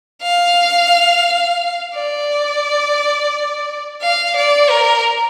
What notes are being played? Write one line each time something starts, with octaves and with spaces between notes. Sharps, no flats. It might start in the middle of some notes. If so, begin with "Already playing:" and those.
F5
D5
F5
D5
A#4